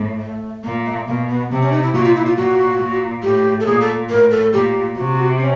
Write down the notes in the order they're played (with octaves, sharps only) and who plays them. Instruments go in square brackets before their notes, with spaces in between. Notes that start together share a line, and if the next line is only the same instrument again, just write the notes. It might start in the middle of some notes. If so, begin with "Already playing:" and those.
Already playing: [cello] A2
[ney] A3
[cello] A#2 [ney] A#3
[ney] A3
[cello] B2 [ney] A#3
[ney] B3
[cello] C3 [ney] C4
[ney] C#4
D#4
E4
[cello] A#2 [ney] F#4
[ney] F4
E4
F4
[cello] A#2 [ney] F#4
[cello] A#2
[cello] A2 [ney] G4
[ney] A4
[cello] A#2 [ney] G#4
[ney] A4
[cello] A2 [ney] A#4
[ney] A4
[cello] A#2 [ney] G4
[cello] C3 [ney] F#4
[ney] C#4